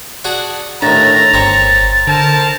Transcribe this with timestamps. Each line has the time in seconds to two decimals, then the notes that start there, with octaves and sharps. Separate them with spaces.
0.25 D4 F#4 G#4
0.82 D#2 A2 D4 A#5 A6
1.34 G1 C4 C#5
2.07 D3 A#4 C5 A5